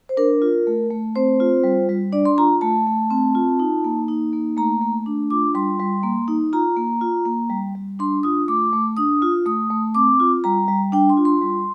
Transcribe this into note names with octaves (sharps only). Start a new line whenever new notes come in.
C5
D4 A#4
F4
A3
A3
C4 C5
F4
G3
G3
D4 D5
C6
F4 A#5
A3 A5
A3
C4
F4
D#4
A#3
D#4
A#3
A3 A#5
A3
D4
F4 D6
G3 C6
G3
A#3
D#4
F4 A#5
A#3
F4
A#3
G3
G3
D4 C6
F4 D#6
A3 D6
A3
D4 D#6
F4
A3 D#6
A3
C4 D6
F4
G3 A#5
G3
D4 G5
C6
F4
C6
G3